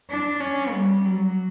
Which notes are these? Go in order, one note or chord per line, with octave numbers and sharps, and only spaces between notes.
D4
C#4
G3
F#3